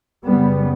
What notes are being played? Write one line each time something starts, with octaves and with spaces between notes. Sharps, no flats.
F#2 C#3 G3 B3